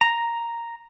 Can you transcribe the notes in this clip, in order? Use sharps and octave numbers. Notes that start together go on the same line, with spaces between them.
A#5